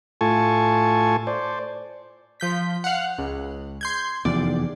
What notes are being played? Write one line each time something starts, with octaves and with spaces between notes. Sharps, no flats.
A2 F4 A4 G#5 A5 C#6
C5 D5
F3 G6 B6
F5 F#5
C#2
C6 G6 G#6
F1 E2 D5